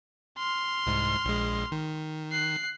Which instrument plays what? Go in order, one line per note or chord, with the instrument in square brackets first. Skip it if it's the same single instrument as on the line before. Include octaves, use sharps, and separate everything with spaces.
[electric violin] C6 F6
[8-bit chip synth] C2 G#2
A#1 G#3
D#3
[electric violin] F#6 C7